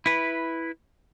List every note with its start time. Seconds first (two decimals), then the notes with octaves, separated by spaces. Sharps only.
0.06 E4 B4